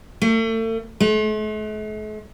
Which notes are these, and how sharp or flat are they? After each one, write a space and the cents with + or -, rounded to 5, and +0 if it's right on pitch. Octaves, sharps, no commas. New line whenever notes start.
A3 +40
A3 -45